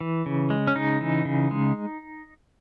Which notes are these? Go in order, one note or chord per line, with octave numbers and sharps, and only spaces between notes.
E3
C#3
G#3
C#4
C#3 D#4
E3
C#3
G#3